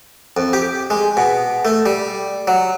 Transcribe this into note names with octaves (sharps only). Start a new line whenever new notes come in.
F2
G4
G#3
B2
A3
G3
F#3